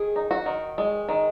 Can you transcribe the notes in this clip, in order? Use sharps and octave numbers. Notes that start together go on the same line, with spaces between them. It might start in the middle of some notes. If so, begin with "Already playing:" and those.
Already playing: D#3 G#4
D#4
F#4
D#3
G#3
D#3